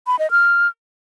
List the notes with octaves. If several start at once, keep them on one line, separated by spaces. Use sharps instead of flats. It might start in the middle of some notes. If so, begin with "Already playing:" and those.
B5
D#5
F6